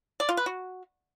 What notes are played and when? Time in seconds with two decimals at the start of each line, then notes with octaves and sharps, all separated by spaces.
0.20 D5
0.29 F4
0.37 B4
0.46 F#4